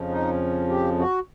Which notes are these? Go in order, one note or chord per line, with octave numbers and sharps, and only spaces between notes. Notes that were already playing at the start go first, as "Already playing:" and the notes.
Already playing: F2 C#3 F3
D#4
G4
F#4